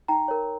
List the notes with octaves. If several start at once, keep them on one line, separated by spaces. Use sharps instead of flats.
D#4 G5 A#5
A#4 C#5